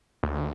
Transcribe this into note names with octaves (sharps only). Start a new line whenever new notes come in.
D2